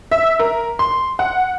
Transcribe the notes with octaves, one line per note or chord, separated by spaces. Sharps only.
E5
A#4
C6
F#5